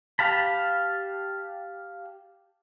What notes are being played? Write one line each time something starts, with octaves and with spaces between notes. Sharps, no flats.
G4 F5 A5 B5